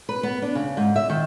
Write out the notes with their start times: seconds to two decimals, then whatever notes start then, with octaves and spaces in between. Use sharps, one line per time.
0.09 B4
0.23 B3
0.42 D4
0.55 C#3
0.77 G#2
0.96 E5
1.10 D#3